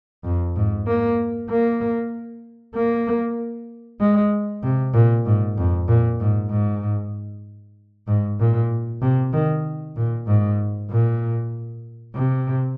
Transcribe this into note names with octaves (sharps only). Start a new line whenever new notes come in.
F2
G#2
A#3
A#3
A#3
G#3
C3
A#2
G#2
F2
A#2
G#2
G#2
G#2
A#2
C3
D#3
A#2
G#2
A#2
C3